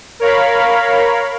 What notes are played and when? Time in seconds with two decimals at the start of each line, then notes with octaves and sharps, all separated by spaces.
0.20 A#4 C#5 F5 B5